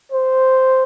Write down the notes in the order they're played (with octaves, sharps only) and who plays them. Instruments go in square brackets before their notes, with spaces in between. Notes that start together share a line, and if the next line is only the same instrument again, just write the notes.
[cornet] C5